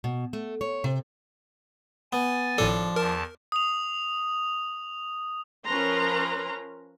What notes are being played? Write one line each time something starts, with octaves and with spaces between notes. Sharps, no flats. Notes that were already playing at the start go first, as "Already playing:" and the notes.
B2
A3
C#5
C3
B3 G#5 A6
G#1 A2 F3 D4 A4
E2 A#4 A5
D#6 F7
F3 C#4 A#4 B4 A#5 C6